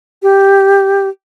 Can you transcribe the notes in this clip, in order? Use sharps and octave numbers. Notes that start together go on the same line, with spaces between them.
G4